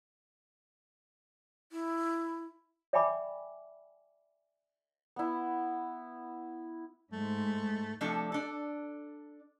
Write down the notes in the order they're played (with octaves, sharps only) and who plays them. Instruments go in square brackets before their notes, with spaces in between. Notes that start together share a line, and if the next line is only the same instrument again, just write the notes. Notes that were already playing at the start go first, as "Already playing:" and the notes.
[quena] E4
[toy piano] D5 E5 G5 G#5 B5 D6
[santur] B3 E4
[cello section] G#2 [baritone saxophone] A3
[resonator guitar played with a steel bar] C3 F3 A3 D4 A4
D4 A4